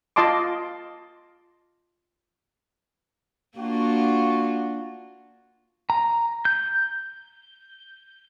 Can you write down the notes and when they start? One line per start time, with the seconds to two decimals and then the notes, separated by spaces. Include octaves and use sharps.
0.16 F4 D#5 A5 C6 D6
3.57 A#3 D4 F4 F#4
5.90 A#5
6.45 G6